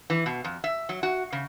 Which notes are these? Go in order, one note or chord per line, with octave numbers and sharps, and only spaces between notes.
E3
B2
F2
E5
F#3
F#4
C#3